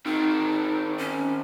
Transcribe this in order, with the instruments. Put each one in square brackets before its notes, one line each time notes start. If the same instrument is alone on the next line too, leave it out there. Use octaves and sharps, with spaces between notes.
[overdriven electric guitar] D#3 C4 [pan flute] D#4
[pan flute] C#4